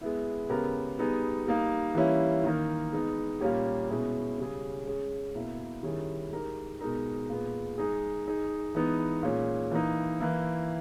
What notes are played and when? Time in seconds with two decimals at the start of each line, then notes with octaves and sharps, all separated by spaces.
0.01 G#3 B3 E4
0.49 C#3 G#3 B3 G4 A#4
0.99 G3 B3 D#4 G#4
1.47 G3 A#3 D#4
1.95 E3 G3 A#3 C#4 E4
2.43 D#3 A#3 D#4 A#4
2.93 G#3 B3 D#4
3.40 A#2 G3 A#3 C#4 G4
3.89 B2 G#3 C#4 E4 G#4
4.38 C#3 G3 C#4 G#4
4.86 G#3 C#4 G#4
5.35 B2 A#3 E4
5.83 D#3 G3 C#4 E4 G#4
6.32 G#3 D#4 G4 A#4
6.80 B2 G#3 D#4 A#4
7.29 A#2 G#3 B3
7.78 G#3 D#4 G#4
8.26 G#3 D#4 G#4
8.74 E3 G#3 B3 D#4
9.23 A#2 G#3 C#4
9.71 E3 A#3 D#4
10.20 E3 A#3 E4